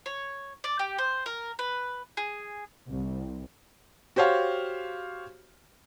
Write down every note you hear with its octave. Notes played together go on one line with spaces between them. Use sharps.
C#5
D5
G4
C5
A#4
B4
G#4
C2
F#4 G4 C5 C#5 F5